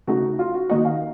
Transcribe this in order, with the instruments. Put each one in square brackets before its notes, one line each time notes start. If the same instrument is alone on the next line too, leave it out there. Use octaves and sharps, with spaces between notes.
[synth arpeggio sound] C#3 A3 D#4 [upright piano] F#4
[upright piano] F4
F#4
[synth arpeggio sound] D#3 A#3 D#4 F#4 [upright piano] D#5
[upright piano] F5